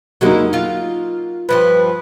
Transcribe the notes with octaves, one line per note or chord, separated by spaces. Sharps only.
D3 F#3 G#3 A#3 D#4 E4
F4 F5
G2 F3 G3 B4